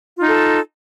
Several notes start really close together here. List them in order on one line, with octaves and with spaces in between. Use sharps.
F4 D#4 A4